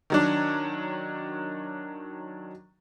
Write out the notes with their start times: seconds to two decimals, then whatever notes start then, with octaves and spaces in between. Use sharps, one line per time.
0.10 D#3 F#3 D4